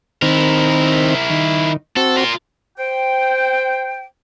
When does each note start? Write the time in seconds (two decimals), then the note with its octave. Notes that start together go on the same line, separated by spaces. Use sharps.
0.22 D#3 C4 E4 A#4
1.30 D#3
1.96 C4 F#4 A4
2.17 F4 A#4
2.78 C5 G5